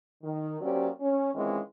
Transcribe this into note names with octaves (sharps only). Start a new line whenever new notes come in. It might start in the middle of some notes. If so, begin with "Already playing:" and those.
D#3
F#3 A#3 C#4 G4 C5 D5
C#4
D#3 E3 G#3 C4 C#4 F4